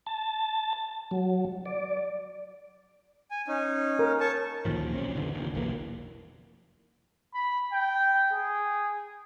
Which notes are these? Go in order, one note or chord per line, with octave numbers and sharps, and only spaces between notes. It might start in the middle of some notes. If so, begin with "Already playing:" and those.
A5
F#3
D5
G#5
C#4 D#4
A#4
C#5 A5 C#6
D2 A#2 D#3 F3
B1 C4 C#4
F#1 D2 D3 E3
F1 D#2
F1 B1 E3 A#3
B5
G5
G#4